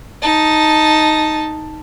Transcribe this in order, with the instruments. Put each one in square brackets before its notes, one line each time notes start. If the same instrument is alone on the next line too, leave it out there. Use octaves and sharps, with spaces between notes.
[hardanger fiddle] D#4 A5